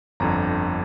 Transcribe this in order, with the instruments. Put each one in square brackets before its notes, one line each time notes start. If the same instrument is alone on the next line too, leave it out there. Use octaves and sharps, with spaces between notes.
[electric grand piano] G1 F2 D3 A#5